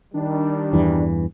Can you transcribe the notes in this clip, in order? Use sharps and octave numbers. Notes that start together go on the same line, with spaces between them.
D#3 G3 D4
E2 G2 E3